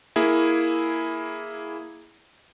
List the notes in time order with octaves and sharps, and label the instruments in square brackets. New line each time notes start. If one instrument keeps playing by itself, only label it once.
[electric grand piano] A#3 E4 G#4